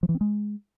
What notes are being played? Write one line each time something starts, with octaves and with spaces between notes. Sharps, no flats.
F3
E3
C4
G#3